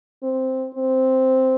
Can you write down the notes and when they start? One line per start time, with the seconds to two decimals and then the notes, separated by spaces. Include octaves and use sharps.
0.23 C4
0.75 C4